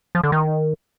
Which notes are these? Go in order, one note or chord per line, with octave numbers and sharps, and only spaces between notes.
F3
D3
D#3